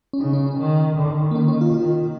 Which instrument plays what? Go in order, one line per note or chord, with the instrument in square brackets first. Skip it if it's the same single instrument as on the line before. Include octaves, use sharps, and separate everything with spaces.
[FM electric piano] C#4
[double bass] C#3 [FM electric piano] D#4
[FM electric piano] C#4
C#4
[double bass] D#3
D#3
[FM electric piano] A#3
C#4
C#4
F4
[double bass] D#3 [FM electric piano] F4